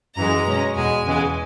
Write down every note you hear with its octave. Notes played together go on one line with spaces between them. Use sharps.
F#2 E3 G#3 A#5
B2 G#3 C#4
E2 B2 G#3 G#5
E2 C#3 E3 G#3